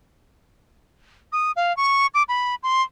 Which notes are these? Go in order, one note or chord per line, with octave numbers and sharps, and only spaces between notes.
D#6
F5
C#6
D6
B5
C6